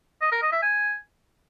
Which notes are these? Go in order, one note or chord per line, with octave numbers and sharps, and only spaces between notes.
D#5
A#4
D#5
E5
G#5